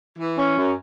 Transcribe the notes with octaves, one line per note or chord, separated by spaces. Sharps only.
E3
C#4
F#2